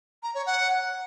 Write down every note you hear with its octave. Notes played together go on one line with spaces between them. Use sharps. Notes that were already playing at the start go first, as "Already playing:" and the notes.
A#5
C#5
F#5